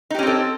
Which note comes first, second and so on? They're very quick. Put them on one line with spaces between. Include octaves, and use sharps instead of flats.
D#4 G4 C#4 C4 A4